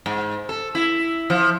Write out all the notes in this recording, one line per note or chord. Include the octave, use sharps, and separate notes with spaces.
G#2
A4
E4
F3